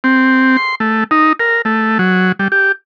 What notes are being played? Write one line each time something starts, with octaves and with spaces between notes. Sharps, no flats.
C4
C6
A3
D#4
A#4
A3
F#3
G3
G4